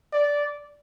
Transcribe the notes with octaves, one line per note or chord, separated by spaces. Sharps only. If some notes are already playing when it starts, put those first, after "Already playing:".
D5